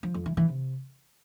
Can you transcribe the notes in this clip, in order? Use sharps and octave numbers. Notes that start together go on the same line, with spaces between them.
F3
F2
E3
E3
C3